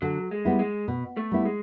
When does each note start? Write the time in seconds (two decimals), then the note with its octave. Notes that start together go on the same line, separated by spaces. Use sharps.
0.02 D3 F#3
0.31 G#3
0.45 G3 B3 E4
0.59 G#3
0.88 B2
1.17 A3
1.32 G3 B3 E4
1.45 G#3